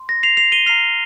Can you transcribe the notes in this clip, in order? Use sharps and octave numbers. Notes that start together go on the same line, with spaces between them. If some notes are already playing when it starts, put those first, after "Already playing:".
Already playing: C6
A#6
C7 F7
C7 F7
D#7 G7
A#5 F6 C7 F7